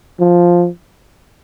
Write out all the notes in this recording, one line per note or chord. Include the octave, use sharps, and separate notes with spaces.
F3